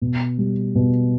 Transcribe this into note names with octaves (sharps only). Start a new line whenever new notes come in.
B2
G3
B2